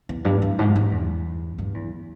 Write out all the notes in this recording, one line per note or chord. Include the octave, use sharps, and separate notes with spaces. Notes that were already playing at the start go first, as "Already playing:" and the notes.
E2
G2
E2
G#2
G2
E2
G2
E2